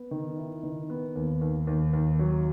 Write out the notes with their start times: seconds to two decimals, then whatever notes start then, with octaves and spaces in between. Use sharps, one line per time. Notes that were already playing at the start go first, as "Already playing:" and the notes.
Already playing: B3
0.11 D#3
0.38 E4
0.63 D#3
0.90 B3
1.16 D#2
1.41 D#2
1.67 D#2
1.93 D#2
2.19 F#3